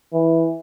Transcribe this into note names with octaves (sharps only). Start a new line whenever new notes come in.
E3